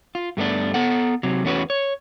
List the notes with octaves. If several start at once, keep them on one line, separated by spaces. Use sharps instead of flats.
F4
G2 A3 B3 D4
B3 A4 F#5
C3 F#3
E2 A3 C#4 F#4 B4
C#5